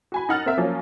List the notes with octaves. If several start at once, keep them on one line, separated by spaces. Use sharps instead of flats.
F#4 G#5 B5
D#4 F#5 F6 A6
C4 A#4 E5
F3 F#3 A#3 C#4